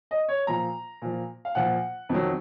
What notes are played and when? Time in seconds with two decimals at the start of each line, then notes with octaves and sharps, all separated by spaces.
0.11 D#5
0.29 C#5
0.47 A#2 F3 A#5
1.02 A#2 F3
1.45 F5
1.55 A#2 F3 F#5
2.09 F2 D#3 F#3